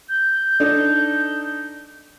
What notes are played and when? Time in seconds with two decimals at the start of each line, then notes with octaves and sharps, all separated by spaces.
0.09 G6
0.60 D4 D#4 A4